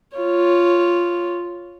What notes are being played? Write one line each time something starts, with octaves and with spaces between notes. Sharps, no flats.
F4 C#5